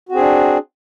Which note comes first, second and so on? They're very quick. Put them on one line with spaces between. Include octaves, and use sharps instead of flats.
F#4 C4 G#4 D4